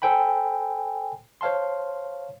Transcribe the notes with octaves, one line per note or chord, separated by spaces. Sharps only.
A4 C5 G5 G#5 B5
C5 C#5 F5 A5 C6